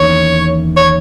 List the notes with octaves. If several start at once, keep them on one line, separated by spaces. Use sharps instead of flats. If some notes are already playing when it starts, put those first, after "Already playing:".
Already playing: E2 D#3 A#3 C#4 E4 C#5
C#5